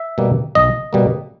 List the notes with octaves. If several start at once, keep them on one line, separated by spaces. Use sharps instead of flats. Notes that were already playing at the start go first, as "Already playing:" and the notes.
Already playing: E5
B2 G3 A#3
B1 D#5
B2 G3 A#3